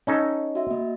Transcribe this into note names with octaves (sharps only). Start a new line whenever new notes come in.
C#4 D#4 A4
F#4 E5
A#3 D#5